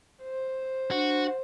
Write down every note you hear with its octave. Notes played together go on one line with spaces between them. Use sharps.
C5
D4 F#4